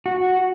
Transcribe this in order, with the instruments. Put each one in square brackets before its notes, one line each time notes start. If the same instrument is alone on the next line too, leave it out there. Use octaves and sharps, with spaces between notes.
[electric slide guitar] F#4